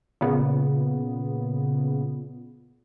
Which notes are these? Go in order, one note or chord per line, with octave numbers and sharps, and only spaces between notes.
A#2 C#3 B3